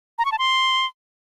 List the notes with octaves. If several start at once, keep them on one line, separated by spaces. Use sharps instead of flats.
A#5
C#6
A5
C6